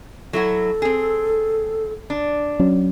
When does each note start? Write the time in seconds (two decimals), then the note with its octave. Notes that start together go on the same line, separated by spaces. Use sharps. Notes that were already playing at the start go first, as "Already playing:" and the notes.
0.33 F#3 E4 F#4 A4
0.82 C4 G#4
2.10 D4
2.59 F#3 C#4